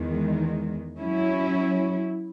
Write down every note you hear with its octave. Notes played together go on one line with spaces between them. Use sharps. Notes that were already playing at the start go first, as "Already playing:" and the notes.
Already playing: E2 D#3 G#3
F#3 C#4 E4